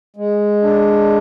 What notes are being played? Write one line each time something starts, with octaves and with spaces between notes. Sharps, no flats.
G#3
D4